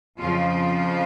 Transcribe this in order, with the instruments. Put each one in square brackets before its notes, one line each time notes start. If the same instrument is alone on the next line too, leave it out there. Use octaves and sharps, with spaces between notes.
[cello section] F2 C#3 F3 F4